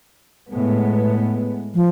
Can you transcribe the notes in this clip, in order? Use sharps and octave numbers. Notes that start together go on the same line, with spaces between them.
A2 G#3 B3
F3